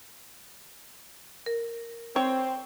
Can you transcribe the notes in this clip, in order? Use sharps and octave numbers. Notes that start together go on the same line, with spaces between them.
A#4
C4 C#5 G5